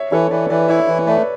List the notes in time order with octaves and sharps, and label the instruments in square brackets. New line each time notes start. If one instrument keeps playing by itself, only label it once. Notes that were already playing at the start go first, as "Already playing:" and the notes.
Already playing: [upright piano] C#5 E5
[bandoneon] E3 [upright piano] A4 C#5
[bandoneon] E3 [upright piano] B4 D5
[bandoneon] E3 [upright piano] B4 D5
[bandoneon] E4 [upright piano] C#5 E5
[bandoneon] E3
[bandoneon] A3 [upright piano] B4 D5